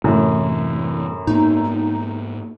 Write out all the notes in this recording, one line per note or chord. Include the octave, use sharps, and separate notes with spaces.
F#2 A2 C3 E3
G#2 A#3 B3 D#4